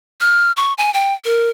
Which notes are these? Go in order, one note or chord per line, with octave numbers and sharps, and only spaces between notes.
F6
C#6
G#5
G5
A#4